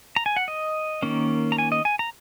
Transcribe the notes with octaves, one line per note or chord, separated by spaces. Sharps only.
A#5
G#5
F#5
D#5
D#3 A#3 C#4
A#5
G#5
D#5
G#5
A#5